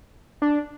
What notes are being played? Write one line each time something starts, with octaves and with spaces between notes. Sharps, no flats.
D4